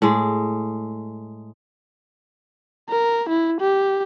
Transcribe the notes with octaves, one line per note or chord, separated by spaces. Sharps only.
A2 G#3
A#4
E4
G4